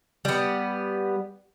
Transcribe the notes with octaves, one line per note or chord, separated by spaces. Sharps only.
G3 B3